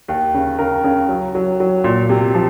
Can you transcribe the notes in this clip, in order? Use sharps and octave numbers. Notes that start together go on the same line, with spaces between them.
D#2
C#3
C#3 A#4
C#3
F#3
F#3
F#3
A#2
C3
F3